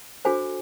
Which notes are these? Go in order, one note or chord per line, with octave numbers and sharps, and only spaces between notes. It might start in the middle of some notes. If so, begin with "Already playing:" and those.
D4 F#4 A4 C5 G#5